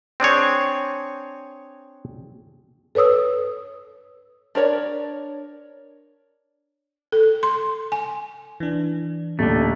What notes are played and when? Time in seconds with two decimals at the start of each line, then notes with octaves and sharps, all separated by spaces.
0.20 C4 D4 G#4 C#5
2.95 A4 B4 C#5 D#6 E6
4.55 D4 A#4 C#5 D5
7.12 A4
7.43 C6
7.92 G#5
8.60 E3 D4
9.39 D#1 D3 A3